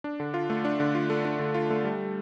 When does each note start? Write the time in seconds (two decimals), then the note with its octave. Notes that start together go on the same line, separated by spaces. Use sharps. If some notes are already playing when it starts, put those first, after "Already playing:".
0.04 D4
0.20 D3
0.34 F4
0.50 A3
0.65 D4
0.80 D3
0.95 F4
1.10 A3
1.25 D4
1.39 D3
1.54 F4
1.70 A3
1.85 G3